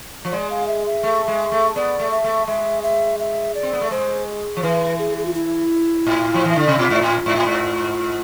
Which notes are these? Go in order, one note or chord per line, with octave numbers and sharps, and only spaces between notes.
F3
G#3 D5
F5
E5
E5
A3
G#3
A3
B3 D5
A3
E5
A3
G#3 E5
E5
E5
D5
C4
B3
A3
G#3 C5
F3
E3 B4
G#4
G#4
F4
E4
A2
F3
E3
D3
C3
B2 F4
G#2
A2
G#2
A2
G#2